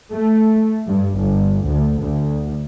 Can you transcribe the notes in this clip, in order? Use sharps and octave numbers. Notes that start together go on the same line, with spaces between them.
A3
G2
G1
D2
D2